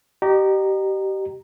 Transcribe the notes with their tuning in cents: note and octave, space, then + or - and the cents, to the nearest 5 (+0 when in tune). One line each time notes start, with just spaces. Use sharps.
G4 -25 D#5 -40 A#5 +0